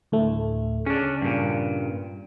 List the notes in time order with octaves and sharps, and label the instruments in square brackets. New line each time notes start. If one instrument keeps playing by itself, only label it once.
[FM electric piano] D2 A2 A3
[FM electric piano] C#3 [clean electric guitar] C#4 D4
[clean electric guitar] G2 A#2